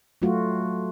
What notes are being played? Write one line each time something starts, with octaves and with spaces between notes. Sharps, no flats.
F#3 A3 F4 F#4